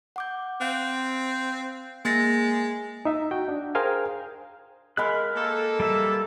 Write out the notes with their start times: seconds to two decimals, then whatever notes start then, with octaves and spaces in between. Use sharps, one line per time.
0.16 F#5 D6 G6
0.61 C4 F5 F#6
2.05 G#3 A#3 A6 A#6
3.05 D#4 E5
3.31 F#4 G5
3.48 D4
3.75 G#4 A#4 C5 F5 G5 G#5
4.97 G#3 A#4 F5 B5 F#6
5.35 A#3 A4
5.80 G3 E5